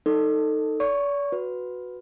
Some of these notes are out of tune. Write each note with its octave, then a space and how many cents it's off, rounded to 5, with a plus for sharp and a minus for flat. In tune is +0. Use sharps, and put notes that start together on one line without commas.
D#4 +0 A4 +20
D5 -45 C#6 +0
F#4 -10 B4 +0